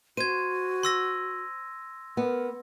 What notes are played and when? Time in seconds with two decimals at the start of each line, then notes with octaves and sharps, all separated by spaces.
0.17 F#4 C5 G#6 D#7
0.83 C6 E6 A#6
2.17 B3 A#4